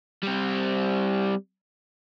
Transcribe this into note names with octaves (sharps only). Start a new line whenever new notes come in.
G3 C4